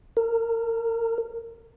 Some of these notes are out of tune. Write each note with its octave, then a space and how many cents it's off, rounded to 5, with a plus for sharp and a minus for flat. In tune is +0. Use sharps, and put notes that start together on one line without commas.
A#4 -25